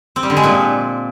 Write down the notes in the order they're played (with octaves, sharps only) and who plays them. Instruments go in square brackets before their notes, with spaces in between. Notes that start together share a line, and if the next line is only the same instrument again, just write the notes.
[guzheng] C4
G3
D3
G#3
A#2